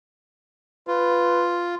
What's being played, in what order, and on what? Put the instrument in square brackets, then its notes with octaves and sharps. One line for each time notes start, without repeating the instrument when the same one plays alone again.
[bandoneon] F4 [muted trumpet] B4